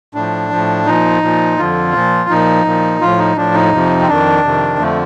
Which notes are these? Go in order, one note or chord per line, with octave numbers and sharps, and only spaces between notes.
A2 F3 D4
A2 F3
A#2 F3 D#4
A#2 F3
F2 D3 F3 F4
A#2 F3
A#2 F3 D#4
A#2 F3
A2 F3 F4
D#4
A2 F3 D4
D#4
F2 C3 F3
C4
F2 D#3 D4
F2 C3 D#3
F2 D3 F3 A3